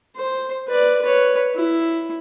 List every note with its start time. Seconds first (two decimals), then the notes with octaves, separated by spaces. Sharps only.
0.17 C5
0.68 B4 D5
1.02 B4 C#5
1.55 E4